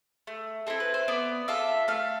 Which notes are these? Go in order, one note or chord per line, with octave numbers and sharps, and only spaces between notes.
A3
C4 E4 A4
B4
C5
B3 D5
F4 A4 E5
A3 F5